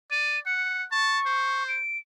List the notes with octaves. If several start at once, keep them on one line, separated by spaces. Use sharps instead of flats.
D5 D#7
F#5 C#7
A5 C#6
C5
D7